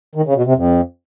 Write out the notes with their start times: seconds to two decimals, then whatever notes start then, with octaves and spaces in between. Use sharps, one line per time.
0.15 D#3
0.26 C#3
0.36 B2
0.46 C3
0.56 F2